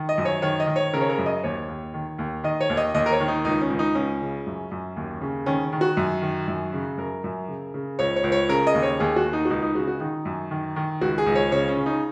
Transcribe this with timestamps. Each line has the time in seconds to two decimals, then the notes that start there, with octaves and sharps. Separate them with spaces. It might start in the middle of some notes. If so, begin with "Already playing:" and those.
Already playing: D#3
0.09 D#5
0.18 F#2
0.25 C#5
0.42 D#3 C#5
0.60 D#5
0.67 D#3
0.76 C#5
0.93 C#3 A#4
1.01 C#5
1.09 A#4
1.18 F#2
1.26 D#5
1.43 D#2 C#5
1.68 D#2
1.94 D#3
2.19 D#2
2.44 D#3 D#5
2.60 C#5
2.70 D#2
2.77 D#5
2.94 D#2 D#5
3.06 A#4
3.12 C#5
3.20 D#3
3.28 D#4
3.45 C#2 D#4
3.61 C#4
3.70 C#2
3.79 D#4
3.95 C#2 C#4
4.21 C#3
4.46 F#2
4.71 F#2
4.96 D#2
5.21 C#3
5.46 D#3 C#4
5.73 D#3
5.81 F#4
5.97 F#2
6.22 D#3
6.48 F#2
6.72 C#3
6.97 F#2 A#4
7.24 F#2
7.48 C#3
7.74 C#3
7.99 C#2 C#5
8.16 C#5
8.24 C#2
8.32 C#5
8.49 C#3 A#4
8.67 D#5
8.74 D#2
8.83 C#5
9.00 D#2 G#4
9.16 F#4
9.25 D#2
9.33 D#4
9.45 F#4
9.50 C#2 D#4
9.62 D#4
9.75 C#3 F#4
9.87 F#4
10.00 D#3 D#4
10.25 F#2
10.51 D#3
10.76 D#3
11.01 C#2 F#4
11.18 G#4
11.26 C#2
11.35 C#5
11.52 C#3 C#5
11.68 C#4
11.77 C#3
11.86 D#4